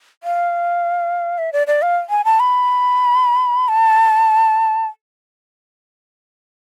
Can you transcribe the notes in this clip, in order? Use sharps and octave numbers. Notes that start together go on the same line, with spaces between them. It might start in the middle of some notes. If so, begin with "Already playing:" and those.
F5
E5
D5
D5
F5
G#5
A5
B5
A5